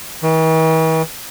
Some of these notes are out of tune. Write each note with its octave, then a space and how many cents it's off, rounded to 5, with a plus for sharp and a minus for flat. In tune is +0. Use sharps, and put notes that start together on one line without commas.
E3 -45